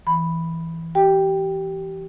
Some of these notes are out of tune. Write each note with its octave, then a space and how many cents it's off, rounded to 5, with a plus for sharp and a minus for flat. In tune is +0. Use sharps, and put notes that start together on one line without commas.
E3 +0 B5 +0
G4 -25 G5 +5